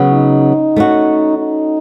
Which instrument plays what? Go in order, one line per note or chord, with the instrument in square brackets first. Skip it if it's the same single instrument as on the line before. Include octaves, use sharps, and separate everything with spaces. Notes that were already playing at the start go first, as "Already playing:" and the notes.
Already playing: [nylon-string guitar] C#3 F#3 B3
[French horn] D#4
[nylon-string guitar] A3 C#4 F#4
[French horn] D#4